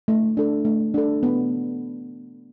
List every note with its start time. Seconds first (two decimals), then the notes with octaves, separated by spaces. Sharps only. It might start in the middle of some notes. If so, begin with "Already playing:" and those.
0.08 A3
0.37 D4 A4
0.65 A3
0.94 D4 A4
1.23 B3